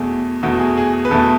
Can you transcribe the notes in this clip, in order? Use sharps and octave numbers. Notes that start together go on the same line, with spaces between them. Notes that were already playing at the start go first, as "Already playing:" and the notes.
Already playing: E2 B2 A3 G#4
E2 B2 A3 F#4
G#4
G#4
G#4
B4
E2 B2 A3 A4